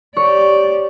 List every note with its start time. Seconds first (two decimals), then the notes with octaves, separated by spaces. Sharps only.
0.17 G4 C#5 D5